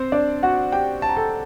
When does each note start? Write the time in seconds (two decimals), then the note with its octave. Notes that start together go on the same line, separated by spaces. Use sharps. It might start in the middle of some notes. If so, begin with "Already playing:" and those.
Already playing: C4 C5
0.12 D4 D5
0.43 F#4 F#5
0.72 G4 G5
1.02 A5
1.09 A#5
1.17 A4 A5